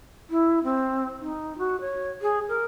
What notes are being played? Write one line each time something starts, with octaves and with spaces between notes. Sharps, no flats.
E4
C4
D#4
F#4
C#5
G#4
A#4